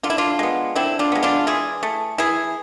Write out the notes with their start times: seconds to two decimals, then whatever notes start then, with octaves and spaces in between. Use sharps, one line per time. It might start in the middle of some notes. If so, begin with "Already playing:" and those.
0.03 D3 F4
0.10 E4
0.18 D4 F4
0.39 G#3 B3
0.75 D3 C4 E4
0.99 D4 F4
1.12 G#3 B3
1.23 D4 F4
1.47 E3 E4 G#4
1.83 A3
2.18 E3 E4 G#4